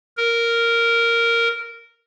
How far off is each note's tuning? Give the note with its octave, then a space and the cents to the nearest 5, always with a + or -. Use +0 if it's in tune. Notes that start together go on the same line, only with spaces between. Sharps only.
A#4 -5